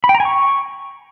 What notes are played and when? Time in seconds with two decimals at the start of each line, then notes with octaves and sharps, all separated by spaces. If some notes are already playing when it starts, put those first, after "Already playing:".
0.04 B5
0.09 G5
0.15 A#5
0.20 G#5
0.25 C#6